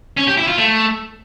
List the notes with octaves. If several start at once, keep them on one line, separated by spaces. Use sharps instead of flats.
C#4
G4
E4
F4
A3